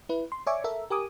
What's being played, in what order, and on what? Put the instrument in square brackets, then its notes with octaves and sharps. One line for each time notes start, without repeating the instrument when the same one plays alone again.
[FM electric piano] E4 B4
C6
C#5 D5 E5 G#5 C#6 D6
A4 A#4 E5
G4 A#4 G#5 D6 D#6